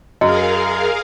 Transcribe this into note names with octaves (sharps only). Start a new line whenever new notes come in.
F#2 G#4 A#4 D#5 F5